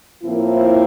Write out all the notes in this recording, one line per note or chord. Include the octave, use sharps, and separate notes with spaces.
A2 F3 A#3 C4 E4